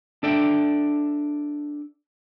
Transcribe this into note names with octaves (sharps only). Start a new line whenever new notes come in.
D4 A4 D5 E5 G5